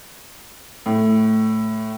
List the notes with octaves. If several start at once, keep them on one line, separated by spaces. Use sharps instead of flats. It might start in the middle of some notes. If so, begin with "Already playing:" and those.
A2